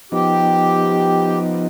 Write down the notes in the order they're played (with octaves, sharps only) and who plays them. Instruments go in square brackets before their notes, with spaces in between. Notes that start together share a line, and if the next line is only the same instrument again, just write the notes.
[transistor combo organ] F3 B3 D#4 [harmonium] G4